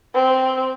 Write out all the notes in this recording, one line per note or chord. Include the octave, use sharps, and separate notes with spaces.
C4